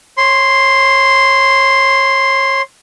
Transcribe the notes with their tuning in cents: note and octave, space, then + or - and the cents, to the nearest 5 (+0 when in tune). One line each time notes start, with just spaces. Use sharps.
C#5 -25 C6 +0